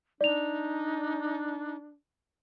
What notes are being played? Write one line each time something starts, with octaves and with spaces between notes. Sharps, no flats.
D4 D#4 D5 F7